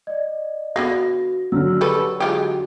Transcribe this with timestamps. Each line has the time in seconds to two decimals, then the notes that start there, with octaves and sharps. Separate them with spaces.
0.07 D5 D#5
0.76 D3 B3 F#4 F5 A#6
1.52 D3 F#3 E6 F6
1.81 G3 A4 B4 C#6
2.20 G#3 F4 G4